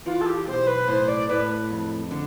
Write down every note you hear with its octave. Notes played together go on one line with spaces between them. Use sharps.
E3 F4
A4
G4
B1 C5
B4
A2 C5
D5
A2 B4
F2
D3